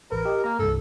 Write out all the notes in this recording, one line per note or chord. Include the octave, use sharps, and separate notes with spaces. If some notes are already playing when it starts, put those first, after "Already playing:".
A1 A#4 B4
G4 D#5
A#3 A#5
C2 G2 A4